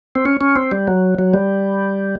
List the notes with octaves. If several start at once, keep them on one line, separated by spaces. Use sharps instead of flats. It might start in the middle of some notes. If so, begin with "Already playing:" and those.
C4
C#4
C#4
C4
G3
F#3
F#3
G3